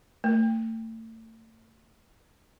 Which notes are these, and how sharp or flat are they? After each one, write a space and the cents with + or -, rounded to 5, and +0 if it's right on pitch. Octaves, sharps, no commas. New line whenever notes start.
A3 +35